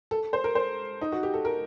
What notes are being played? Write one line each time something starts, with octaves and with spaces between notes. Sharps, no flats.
A4
C5
A#4
C5
D#4
F#4
G4
A4
A#4